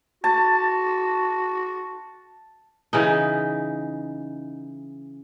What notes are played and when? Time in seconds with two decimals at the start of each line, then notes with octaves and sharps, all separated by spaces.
0.24 F#4 A5
2.93 C#3 E3 D#4